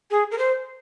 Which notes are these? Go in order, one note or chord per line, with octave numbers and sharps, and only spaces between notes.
G#4
A#4
C5